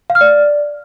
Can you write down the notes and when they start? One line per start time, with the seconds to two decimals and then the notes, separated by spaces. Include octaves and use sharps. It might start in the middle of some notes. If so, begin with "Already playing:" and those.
0.10 F5
0.15 F6
0.21 D5